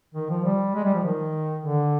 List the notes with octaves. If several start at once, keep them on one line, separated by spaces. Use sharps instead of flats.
D#3
F3
G3
G#3
G3
F3
D#3
D3